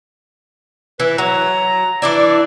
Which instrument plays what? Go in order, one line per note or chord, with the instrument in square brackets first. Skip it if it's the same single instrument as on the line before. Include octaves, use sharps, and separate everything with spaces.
[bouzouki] E3 E4 [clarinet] B4
[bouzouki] F#3 [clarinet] A#5
[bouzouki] E3 D4 E4 [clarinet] D5